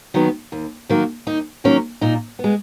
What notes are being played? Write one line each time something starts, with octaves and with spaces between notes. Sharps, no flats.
D#3 F#3 B3
D#2
D#3 F#3 A#3
D#2 D#4
D#3 F#3 A#3 C#4
A#2 D#4
B3
G#3